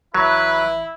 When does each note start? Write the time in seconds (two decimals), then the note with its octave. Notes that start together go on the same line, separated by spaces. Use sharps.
0.14 A1 F#3 E4 B4